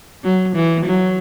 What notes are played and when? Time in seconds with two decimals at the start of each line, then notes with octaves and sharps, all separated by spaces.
0.24 F#3
0.56 E3
0.86 F#3